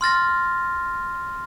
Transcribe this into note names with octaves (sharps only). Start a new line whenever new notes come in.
C6 F6 A6 A#6